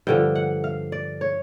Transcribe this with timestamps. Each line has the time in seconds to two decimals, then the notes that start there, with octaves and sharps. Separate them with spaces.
0.07 G2 D3 F3 G5
0.35 F#5
0.64 F5
0.92 D5
1.21 C#5